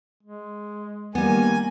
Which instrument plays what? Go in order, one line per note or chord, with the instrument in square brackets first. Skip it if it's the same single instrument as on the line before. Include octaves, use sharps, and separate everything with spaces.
[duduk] G#3
[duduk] D#3 [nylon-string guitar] G3 B3 [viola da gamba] A#3 [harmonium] G#5